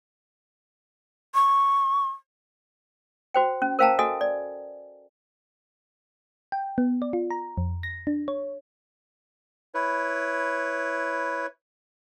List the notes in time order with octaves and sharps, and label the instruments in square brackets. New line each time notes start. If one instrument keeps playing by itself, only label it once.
[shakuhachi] C#6
[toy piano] F#4 C5 G5
C#4
A#4 C5 F5 G5 A5 A#5
F#4 A4 D#5 G#5
D5
[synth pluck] G5
B3
D5
F4
A#5
F2
A#6
D4
C#5
[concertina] E4 B4 C#5